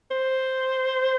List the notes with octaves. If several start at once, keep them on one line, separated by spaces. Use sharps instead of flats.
C5